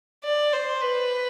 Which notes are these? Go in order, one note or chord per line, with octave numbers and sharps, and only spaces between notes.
D5
C5
B4